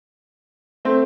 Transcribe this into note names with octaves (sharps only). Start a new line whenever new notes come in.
A3 C4